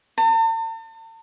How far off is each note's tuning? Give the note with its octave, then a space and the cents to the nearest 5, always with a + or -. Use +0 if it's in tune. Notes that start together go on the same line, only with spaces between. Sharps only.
A5 +45